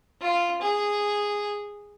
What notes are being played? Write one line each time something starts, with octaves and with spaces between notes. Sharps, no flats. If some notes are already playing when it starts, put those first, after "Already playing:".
F4
G#4